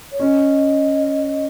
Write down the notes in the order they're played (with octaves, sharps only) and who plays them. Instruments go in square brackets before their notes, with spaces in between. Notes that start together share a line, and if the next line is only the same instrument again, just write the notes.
[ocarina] C#5
[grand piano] C#4 [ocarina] D#5